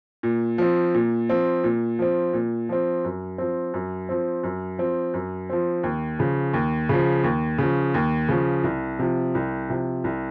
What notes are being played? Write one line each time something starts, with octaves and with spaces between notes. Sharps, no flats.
A#2
F3 C4
A#2
F3 C4
A#2
F3 C4
A#2
F3 C4
F#2
F3 C4
F#2
F3 C4
F#2
F3 C4
F#2
F3 C4
D#2
C#3 F3
D#2
C#3 F3
D#2
C#3 F3
D#2
C#3 F3
C2
C3 F3
C2
C3 F3
C2